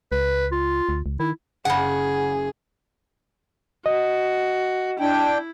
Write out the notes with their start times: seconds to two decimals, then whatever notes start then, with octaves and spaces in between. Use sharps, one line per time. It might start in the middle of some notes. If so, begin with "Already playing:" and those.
0.12 C#2 B4
0.52 F4
0.89 D2
1.06 C#2
1.20 D#3 E4
1.65 F#1 C#3 G#4 F#5
3.86 F#4 D#5
5.00 D4 E4 G5